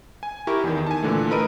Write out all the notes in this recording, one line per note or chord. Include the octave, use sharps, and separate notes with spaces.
G#5
E4 G4 A#4 C#6
E2 D#3
G#5 A5
A#2 D3 E3 A3
A3 A#4 B4 D#5 D7 D#7